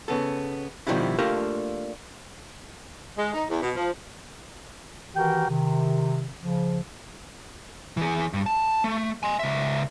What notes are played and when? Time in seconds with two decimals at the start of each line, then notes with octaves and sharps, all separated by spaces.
0.08 C#3 B3 A4
0.87 B2 D#3 F3 G3 D4 E4
1.19 A3 A#3 D4 F4 G4 A#4
3.18 G#3
3.34 D#4
3.49 E2
3.62 B2
3.76 F3
5.15 D#3 E3 F#4 G4 A#4 G5
5.49 C3 D#3
6.40 C#3 F3
7.97 E3 G#4
8.33 G2
8.46 A5
8.84 A3
9.23 G#5 C6
9.39 C#2 E5